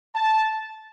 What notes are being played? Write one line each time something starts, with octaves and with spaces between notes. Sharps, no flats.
A5